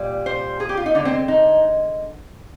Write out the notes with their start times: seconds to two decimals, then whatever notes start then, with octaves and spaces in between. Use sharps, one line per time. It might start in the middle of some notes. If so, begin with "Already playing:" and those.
Already playing: A#2 G3
0.26 C5
0.60 G#4
0.69 G4
0.77 F4
0.86 D#4
0.95 D3 G#3 D4
1.05 C4
1.28 D#4